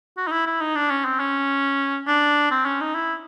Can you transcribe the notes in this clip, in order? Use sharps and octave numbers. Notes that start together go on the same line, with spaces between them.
F#4
D#4
E4
E4
D#4
D4
C#4
C4
C#4
D4
C4
C#4
D#4
E4